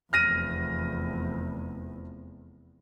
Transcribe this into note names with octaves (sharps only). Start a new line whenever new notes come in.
F1 E2 F6 A#6 D#7